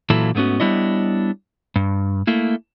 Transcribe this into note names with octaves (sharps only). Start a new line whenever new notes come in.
A#2 E3 F#3 A#3 E4 A4
G#2 A3 B3 C#4 F#4
G3 B3 D4 E4 C#5 D#5
G2
A3 A#3 E4